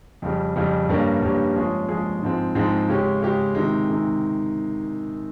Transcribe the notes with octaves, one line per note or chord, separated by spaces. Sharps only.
F2 C#3 G3
F2 C#3 G3
G2 G3 A#3 C#4
G2 G3 A#3 C#4
F3 G#3 C#4 G#4
F3 G#3 C#4 G#4
G#2 F3 G#3 C4
G#2 F3 G#3 C4
C#3 G#3 C#4 G4
C#3 G#3 C#4 G4
C3 D#3 G#3
C3 D#3 G#3